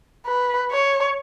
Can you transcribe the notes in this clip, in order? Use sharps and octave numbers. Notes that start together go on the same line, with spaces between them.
B4
C#5